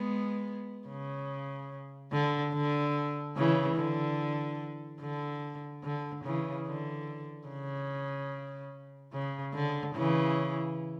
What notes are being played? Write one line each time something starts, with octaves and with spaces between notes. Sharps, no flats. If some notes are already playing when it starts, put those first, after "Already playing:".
Already playing: G#3 B3
C#3
D3
D3
C#3 E3
D3
D3
D3
C#3 E3
D3
C#3
C#3
D3
C#3 E3